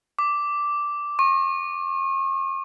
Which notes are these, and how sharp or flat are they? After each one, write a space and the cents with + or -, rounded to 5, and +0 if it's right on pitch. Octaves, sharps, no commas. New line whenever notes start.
D6 -5
C#6 -40